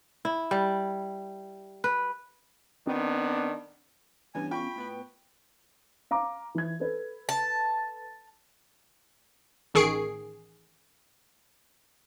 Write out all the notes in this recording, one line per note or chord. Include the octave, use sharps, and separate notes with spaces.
E4
G3
B4
D#3 B3 C4 D4
G2 E3 B3 C#4 G#5
F4 G5 B5 C#6
A2 B3 B4
F5 A#5 D6
E3 G#6
A4 B4
A5
A1 D#3 G#4 C#6 C7 D7